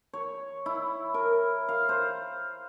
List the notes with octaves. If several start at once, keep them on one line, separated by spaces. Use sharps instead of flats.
C#5
E4
A#4
F5
C5